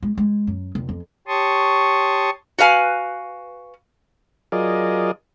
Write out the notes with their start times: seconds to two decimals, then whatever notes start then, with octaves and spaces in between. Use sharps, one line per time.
0.02 G#3
0.17 G#3
0.47 F#2
0.75 F1
0.89 F2
1.28 G4 C#5 A5 C6 C#6 D#6
2.58 F#4 B4 F5 G#5
4.52 F#3 F4 G#4 A#4 D5 D#5